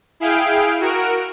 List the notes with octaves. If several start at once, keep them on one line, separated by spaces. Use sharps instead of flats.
E4 G#4 F5 G5 D7
F#4 A#4 D7